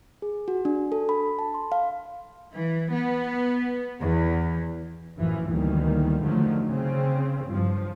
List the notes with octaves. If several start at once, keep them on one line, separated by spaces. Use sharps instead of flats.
G#4
F#4
D4
A4
B5
A5
C6
F5
E3
B3
E2
A1 F#2 E3 F3
D2 B2 D#3 E3 G3 A#3
E2 D3 D#3 F3 F#3 A3
C#3 C4
G2 F3